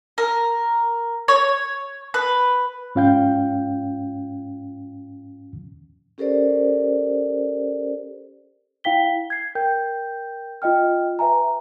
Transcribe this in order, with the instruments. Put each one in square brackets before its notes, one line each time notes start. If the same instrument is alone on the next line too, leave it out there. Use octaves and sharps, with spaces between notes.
[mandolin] A#4
C#5
B4
[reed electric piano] G#2 C#4 F4 F5 G5 G6
[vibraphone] C#4 G4 A4 A#4 C5 D5
[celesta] E4 F5 G5 B6 G7
G#6 C7
A#4 G5 G6
F4 D#5 G5 F6
B4 E5 G#5 A#5